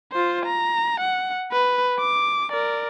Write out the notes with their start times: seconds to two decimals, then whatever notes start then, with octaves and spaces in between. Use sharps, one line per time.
0.12 F4 C5
0.45 A#5
1.00 F#5
1.52 B4
1.99 D6
2.51 A#4 D5